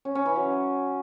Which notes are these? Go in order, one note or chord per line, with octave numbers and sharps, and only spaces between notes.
C#4
C#4
E3
F#3